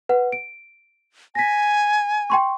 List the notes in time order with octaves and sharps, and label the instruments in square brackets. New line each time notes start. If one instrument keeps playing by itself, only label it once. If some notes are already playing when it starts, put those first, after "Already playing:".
[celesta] B4 F#5
D7
[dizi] G#5 [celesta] A#6 B6
[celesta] G5 C6 C#6